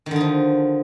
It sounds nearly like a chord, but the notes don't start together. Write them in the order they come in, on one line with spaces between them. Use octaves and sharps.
D#3 D3 D#4 F3